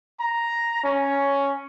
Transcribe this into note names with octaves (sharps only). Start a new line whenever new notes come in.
A#5
C#4